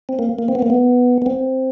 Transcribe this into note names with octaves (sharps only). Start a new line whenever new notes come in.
C4
A#3
A#3
C4
B3
A#3
B3
B3
C4